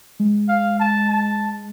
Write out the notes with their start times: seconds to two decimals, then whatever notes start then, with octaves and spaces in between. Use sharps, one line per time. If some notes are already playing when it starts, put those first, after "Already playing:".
0.20 G#3
0.49 F5
0.80 A5
1.10 A5